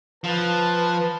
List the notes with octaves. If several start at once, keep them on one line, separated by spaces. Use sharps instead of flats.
F3 B4 A5